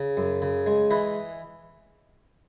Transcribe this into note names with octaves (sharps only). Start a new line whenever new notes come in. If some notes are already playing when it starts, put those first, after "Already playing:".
Already playing: C#3
F#2
C#3
G#3
E3 B4 D#5